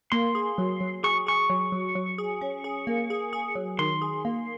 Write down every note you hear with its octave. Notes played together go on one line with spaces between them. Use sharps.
A#3 C6
G#4
F#3
F#3
G#4 C#6
G#4 C#6
F#3
F#3
F#3
G#4
C#4
G#4
A#3
G#4
G#4
F#3
D#3 C6
G#4
A#3